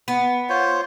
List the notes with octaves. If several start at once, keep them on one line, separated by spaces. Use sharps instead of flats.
B3
F4 C5 C#5